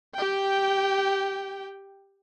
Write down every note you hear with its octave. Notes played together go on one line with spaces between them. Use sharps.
G4 G5